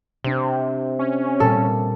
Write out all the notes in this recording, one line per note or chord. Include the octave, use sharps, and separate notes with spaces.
C3 C4 D4 G4
C#4
A#2 G3 A4